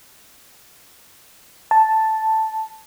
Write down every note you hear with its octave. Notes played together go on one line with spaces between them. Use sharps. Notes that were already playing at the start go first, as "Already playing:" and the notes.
A5